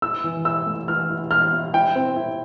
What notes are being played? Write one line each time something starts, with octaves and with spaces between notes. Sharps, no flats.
E4 E6
E3
E4 E6
A3
E3 F6
E4
E3 F6
E4
E4 G5
C4
E4